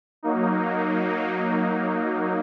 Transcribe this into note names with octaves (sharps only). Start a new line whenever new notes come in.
F#3 A#3 D#4